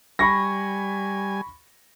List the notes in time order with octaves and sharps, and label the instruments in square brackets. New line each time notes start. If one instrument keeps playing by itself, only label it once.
[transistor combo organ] G3 G#5 [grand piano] B5 C#6 A#6